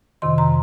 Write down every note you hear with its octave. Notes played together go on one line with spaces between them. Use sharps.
F2 C3 D#3 C6
A#5